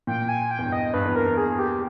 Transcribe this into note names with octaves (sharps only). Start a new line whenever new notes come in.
A#2 G5
G#5
G5
E2
G2
D#5
G2 B4
E2
A#4
E2
G#4
G4